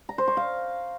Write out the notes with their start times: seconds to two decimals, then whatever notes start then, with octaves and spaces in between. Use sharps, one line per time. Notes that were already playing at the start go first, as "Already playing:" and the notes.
0.09 A#5
0.18 C5
0.28 C#6
0.37 F5